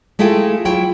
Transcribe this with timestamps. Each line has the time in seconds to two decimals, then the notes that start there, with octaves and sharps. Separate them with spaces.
0.19 G#3 A3 E4 F4 G#4 G5
0.65 F#3 E4 F4 G5